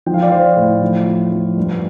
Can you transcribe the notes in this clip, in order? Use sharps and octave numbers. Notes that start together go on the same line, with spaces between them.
F3 G5
F5
D5
F3 C5 F5
A2
F3
F3
F3
G2